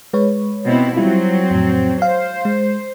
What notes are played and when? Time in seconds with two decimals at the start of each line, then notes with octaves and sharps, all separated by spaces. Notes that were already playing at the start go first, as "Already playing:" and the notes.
0.13 G#3 B4 C#5
0.64 B2 C4 E4
0.96 F#3 G3 C4 E4 F4
1.50 F2 A2
2.02 C5 F5
2.45 G#3